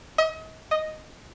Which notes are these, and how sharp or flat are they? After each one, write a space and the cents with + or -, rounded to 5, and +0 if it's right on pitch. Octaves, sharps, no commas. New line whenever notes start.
D#5 +40
D#5 +0